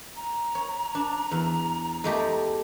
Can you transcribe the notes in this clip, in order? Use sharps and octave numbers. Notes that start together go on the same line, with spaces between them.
A#5
C#5
D4
E2
G#3 A3 G4